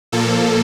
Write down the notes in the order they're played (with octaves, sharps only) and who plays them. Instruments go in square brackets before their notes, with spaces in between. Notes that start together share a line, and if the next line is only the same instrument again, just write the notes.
[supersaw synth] A#2 F3 A#3 A4